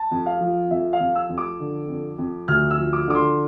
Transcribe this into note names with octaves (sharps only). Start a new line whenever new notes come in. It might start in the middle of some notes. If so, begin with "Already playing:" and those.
Already playing: A5
F2
F5
F3
F2 E5
F5
F2
E6
F2
D6
D3
F2
F2
D2 F6
E6
F3
D6
D3 D6
C6